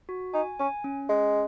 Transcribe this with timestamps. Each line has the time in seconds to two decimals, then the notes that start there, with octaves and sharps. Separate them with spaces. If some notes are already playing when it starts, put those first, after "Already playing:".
0.09 F#4
0.34 D#4 G#5
0.59 C#4 G#5
0.84 C#4
1.09 G#3 C#4